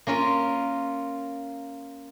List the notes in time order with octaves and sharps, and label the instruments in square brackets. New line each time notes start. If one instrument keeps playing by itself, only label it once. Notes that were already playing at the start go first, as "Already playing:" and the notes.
[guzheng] A#3 C#4 F4 A#4